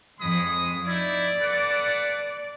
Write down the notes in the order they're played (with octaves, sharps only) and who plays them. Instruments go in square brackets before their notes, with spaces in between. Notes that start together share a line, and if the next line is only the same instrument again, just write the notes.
[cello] F2 F3 [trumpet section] G#3 B5 D#6
[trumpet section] D#4 E4 [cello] D5
[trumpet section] A4 B4 F#5